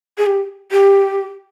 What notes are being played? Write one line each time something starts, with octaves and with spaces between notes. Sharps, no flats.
G#4
G4
G4